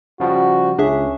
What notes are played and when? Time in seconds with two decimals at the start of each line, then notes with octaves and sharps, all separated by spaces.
0.20 C#3 F3 G3 F#4
0.78 C#2 C#4 D4 G#4 E5